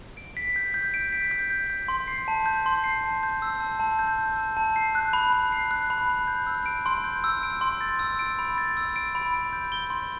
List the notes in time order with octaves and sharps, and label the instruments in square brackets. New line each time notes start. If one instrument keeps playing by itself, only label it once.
[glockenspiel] D7
B6
G6
G6
D7
B6
G6
G6
G6
C6
C7
A5
G6
C6
C7
A5
G6
E6
A5
A5
G6
E6
A5
A5
C7
F#6
B5
B5
C7
F#6
B5
B5
G6
E6
D7
C6
G6
E6
D7
C6
A6
E6
D7
B5
A6
E6
D7
B5
D7
G6
G7
C6